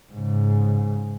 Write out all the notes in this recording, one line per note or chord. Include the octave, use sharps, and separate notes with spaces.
G#2 C#3